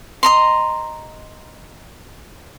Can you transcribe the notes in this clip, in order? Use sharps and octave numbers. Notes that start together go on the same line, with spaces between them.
D#5 A#5 C6